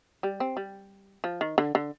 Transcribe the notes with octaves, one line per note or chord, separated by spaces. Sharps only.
G3
C4
G3
F3
D#3
D3
D3